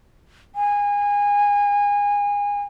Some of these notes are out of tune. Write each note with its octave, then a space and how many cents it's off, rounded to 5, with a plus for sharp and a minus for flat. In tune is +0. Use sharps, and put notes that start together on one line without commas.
G#5 -25